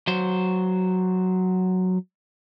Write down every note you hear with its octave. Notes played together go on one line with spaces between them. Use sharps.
F#3 C5